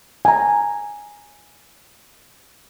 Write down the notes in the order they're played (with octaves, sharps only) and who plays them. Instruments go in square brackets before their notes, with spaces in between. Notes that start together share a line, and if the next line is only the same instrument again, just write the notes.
[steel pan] G#5 A#5